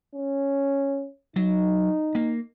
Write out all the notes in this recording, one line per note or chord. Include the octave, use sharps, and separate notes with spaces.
C#4
F#3 D#4
A#3